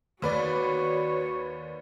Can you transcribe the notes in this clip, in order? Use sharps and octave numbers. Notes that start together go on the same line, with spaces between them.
D#2 F#4 B4 C#5 D5